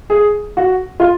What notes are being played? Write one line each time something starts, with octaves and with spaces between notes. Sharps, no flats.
G#4
F#4
F4